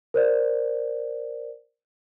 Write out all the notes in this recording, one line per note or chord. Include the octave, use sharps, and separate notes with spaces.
A#4 C5 D5